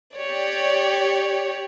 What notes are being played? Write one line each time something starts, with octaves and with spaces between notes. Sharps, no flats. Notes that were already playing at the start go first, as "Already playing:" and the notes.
G4 C#5 D5